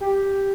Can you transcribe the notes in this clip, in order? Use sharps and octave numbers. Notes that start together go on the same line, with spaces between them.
G4